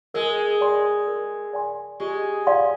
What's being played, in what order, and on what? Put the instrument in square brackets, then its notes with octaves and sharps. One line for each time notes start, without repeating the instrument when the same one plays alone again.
[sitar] G#3 [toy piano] A#4
[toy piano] D5 G#5 C6
A#4
D5 G#5 C6
[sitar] G#3 [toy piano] G4
[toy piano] D5 F5 C6